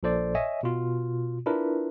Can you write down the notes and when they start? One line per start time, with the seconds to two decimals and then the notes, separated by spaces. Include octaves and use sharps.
0.03 A#1 A#2 A4 C5 D5
0.35 C#5 D#5 E5 G#5
0.63 B2 F4
1.46 D4 E4 F4 A#4 B4